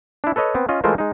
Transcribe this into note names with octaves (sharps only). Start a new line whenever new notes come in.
D4 E4
A4 B4 C#5 D#5
B3 C4
C#4 F4 D#5
E3 G#3 A3 F4 A#4 C5
G#3 D#4